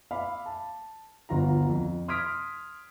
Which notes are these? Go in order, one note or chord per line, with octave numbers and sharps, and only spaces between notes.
E5 F5 B5 D6
A5
G1 D2 F4 A#5
F2
C6 D#6 F6 G#6 B6 D7